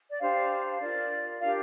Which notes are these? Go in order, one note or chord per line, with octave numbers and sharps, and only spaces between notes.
D5
D4 G4 C5 F5
F4 A#4 D5
D4 G4 A#4 F5